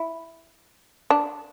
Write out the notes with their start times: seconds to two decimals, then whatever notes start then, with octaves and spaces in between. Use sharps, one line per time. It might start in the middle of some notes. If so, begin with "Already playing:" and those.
Already playing: E4
1.10 D4